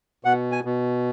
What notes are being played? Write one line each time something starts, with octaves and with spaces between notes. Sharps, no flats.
B2 F#5
G#5
B2